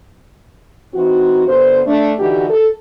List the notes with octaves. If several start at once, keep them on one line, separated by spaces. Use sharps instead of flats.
E3 C4 D#4 F#4
G2 D3 B3 C5
A3 D4
D3 E3 D#4 F#4 G4
A4